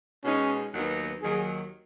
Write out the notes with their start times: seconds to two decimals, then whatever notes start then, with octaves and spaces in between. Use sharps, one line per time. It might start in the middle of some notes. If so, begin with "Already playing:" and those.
0.25 B2 G#3 C#4 D#4
0.74 D#2 D#3 F#3 B3 D#4
1.22 D#2 D#3 F#3 G#4